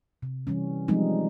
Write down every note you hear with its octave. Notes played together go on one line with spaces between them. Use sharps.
C3
E3 G3 C#4
F3 G3 G#3 C4 D#4